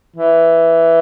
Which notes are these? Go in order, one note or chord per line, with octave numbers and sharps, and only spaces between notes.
E3